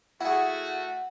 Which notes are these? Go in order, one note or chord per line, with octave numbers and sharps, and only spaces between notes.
A3 E4 F#4 G#4 F#5